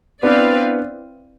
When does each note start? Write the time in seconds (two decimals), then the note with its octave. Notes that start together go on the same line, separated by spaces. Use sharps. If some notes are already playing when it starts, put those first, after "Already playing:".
0.23 B3 C4 D4 E4 B4 D5 F5